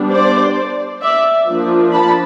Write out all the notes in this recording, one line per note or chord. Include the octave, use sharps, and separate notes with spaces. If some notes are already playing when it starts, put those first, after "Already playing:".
Already playing: G3 B3 D4
C5 D5
D5 E5
F3 A#3 D4
A5 B5